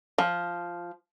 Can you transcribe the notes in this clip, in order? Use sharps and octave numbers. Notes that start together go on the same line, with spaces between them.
F3